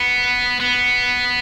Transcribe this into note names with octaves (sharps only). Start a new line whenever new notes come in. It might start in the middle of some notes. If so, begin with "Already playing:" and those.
Already playing: B3
B3